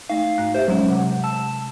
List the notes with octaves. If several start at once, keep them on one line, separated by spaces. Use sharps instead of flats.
A3 D#4 F5
G#2 A3 F#6
G4 C5 E5
F#3 G#3 C#4
C3 F#5
A5 E6